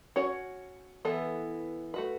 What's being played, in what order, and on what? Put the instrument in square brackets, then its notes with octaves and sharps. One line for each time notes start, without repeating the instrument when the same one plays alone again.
[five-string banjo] C#4 F#4 C#5
E3 B3 E4 A4
A3 F#4 B4